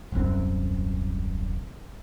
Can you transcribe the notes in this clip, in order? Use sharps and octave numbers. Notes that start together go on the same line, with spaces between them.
D#1 C2 F#2 C4